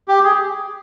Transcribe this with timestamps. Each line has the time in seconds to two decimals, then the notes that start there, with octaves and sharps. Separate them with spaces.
0.08 G4
0.24 G#4